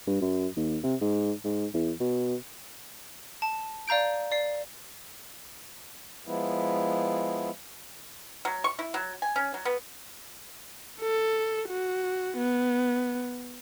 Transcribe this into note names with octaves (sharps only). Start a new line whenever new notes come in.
G2
F#2
D#2
C3
G#2
G#2
E2
B2
A5
D5 F5 A#5 G6 D7
D5 C7
F3 G#3 B3 E4
F#3
C#6
E4
F#3
G#5
C#4
F#3
B3
A4
F#4
B3